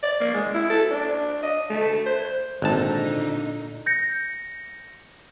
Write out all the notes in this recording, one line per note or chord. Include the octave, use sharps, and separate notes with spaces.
D5
A#3
G#3
E4
A4
D4
D#5
A3
C5
G#1 A#2 D3 D#4 A5
G6 A#6 C#7